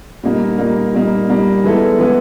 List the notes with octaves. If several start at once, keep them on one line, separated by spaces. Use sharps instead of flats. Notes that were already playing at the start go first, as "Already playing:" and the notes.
A#2 G3 A#3 D#4
A#2 G3 A#3 D#4
A#2 G3 A#3 D#4
A#2 G3 A#3 D#4
E3 G#3 B3 E4 A4
E3 G#3 B3 E4 A4